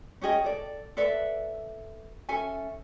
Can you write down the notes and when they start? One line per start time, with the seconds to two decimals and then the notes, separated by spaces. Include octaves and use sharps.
0.21 C#4 G4 G#4 D#5
0.44 A4 D5
0.97 A4 B4 D5 E5
2.29 C#4 A4 E5 G#5